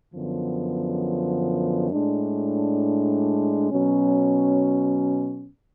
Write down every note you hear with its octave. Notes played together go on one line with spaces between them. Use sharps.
F#2 D3 F3 B3
A2 G#3 D4
B2 F#3 C#4